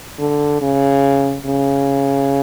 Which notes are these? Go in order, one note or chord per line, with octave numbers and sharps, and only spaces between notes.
D3
C#3
C#3